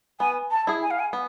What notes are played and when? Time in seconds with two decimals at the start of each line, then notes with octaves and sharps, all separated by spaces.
0.20 B3 G#5
0.51 A5
0.67 E4 G#4
0.83 G#5
0.91 F5
1.00 G#5
1.13 B3